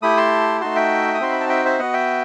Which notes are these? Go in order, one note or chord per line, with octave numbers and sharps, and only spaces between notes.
A3 E4 G4 B5 D#6
A5 C6
A3 D#4 F#4 A5 C6
E5 G5
D#6
C4 D#4 F#4 C6
B5
A5
E5 G5
C5 E5
B3 F#4 D#5 F#5
E5 G5